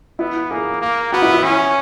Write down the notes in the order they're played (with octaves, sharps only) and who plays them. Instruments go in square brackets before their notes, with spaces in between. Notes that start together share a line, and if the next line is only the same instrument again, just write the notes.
[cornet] B3 [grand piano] E4
[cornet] A#3 [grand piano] G#4
[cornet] A#3
[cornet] B3 [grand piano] F#4
[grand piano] E4
E4
[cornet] C#4